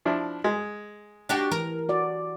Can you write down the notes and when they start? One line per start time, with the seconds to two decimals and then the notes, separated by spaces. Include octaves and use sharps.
0.05 F3 D4 E4
0.44 G#3
1.29 D4 F#4 G4
1.52 E3 A#4
1.89 F#4 D5